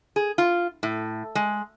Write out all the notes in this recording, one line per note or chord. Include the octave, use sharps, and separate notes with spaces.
G#4
F4
A2
G#3